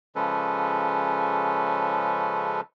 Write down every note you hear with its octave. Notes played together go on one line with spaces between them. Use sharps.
C#3 F3 G#3 C#4 A4 B4